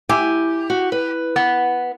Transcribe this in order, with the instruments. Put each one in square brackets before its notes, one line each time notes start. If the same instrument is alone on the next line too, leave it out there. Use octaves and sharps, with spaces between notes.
[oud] E4 [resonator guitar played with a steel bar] G4 [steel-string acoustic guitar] G#5
[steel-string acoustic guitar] F#4
B4
[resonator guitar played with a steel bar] B3